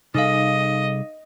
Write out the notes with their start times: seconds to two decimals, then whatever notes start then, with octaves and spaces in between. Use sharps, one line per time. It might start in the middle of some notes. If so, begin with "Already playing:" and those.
0.14 C3 G3 D#4 G#4 A4 D#5 F5